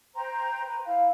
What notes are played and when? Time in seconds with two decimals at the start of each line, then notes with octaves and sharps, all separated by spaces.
0.15 C5 G5 A#5 C6
0.64 B4
0.85 E4 F5